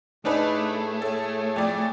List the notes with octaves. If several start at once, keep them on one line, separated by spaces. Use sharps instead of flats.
A2 A3 D4 D#4 G#4 B4
A4 C#5
F2 D5